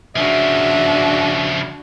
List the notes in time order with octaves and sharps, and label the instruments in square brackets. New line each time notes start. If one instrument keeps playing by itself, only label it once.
[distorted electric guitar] C#3 F3 [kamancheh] D4 F#4 [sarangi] E5